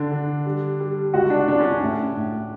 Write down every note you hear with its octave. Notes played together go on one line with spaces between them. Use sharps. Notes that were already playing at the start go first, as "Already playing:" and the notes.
Already playing: D3 D4
D3
G3
G3
C#2 F#4
D4
C#2 D4
C#4
D4
A2
A2